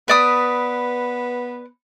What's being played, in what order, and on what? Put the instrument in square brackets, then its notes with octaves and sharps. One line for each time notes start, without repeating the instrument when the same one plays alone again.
[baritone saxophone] B3 [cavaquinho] B4 D5 D#6